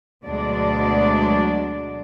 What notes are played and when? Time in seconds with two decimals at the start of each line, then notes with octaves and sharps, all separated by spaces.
0.23 D2 B2 F#3 G#3 D4 D5